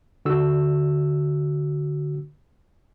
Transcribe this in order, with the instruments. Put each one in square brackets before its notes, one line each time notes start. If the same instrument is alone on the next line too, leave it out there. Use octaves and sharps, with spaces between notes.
[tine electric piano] D3 F#4 E6